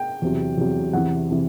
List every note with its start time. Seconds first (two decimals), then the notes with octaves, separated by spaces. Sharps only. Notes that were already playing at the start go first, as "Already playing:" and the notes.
Already playing: G5
0.22 E2 C3 F#3
0.58 E2 C3 F#3
0.93 E2 C3 E3 F#5
1.30 C3 E3